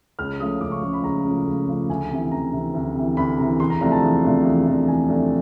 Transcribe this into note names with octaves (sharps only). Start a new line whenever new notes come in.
C#2 F6
C#3 F3 A3 D#6
C#2 D6
C#6
C#3 F3 A3 C#6
B5
C#2 A#5
C#3 F3 A3
C#2
C#3 F3 A3
D2 G#5
C3 E3
D2 A#5
C3 E3
D2
C3 E3
D2 B5
C3 E3 A#5
E2 C6
A#5
C3 F3 A3 D4 A#5
A5
E2
C3 F3 A3 D4
E2
C3 F3 A3 D4
E2 G#5
C3 F3 A3 D4